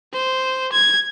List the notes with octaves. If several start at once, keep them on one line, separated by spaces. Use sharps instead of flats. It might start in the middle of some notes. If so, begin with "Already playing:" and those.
C5
G#6